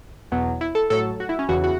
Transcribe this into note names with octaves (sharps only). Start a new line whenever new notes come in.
E2 B2 F#3
E4
A4
A2 F#3 A4
F#4
E4
C#4
E2 C#3 E3 F#4
F#4